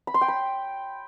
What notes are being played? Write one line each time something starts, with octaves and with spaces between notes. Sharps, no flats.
B5
C6
G5
B5